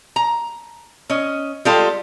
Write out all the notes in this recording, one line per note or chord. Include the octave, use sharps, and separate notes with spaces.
A#5
C#4 D#5
G3 G#3 F4 G4 A4